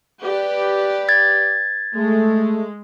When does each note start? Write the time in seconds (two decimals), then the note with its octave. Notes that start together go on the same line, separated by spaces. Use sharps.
0.22 G4 B4 D5
1.09 G#6 A6
1.95 G#3 A3